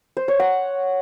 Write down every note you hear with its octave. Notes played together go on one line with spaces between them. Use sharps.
C5
C#5
F#5